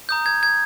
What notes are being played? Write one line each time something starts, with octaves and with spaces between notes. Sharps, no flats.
A#5 D#6 G6
G#6
G#6